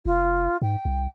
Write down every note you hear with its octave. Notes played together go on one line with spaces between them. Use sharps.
F1 F4
G#2 G5
C2